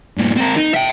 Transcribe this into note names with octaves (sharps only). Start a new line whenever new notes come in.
G2 A#2
C4 A#4
D#4
E5 G5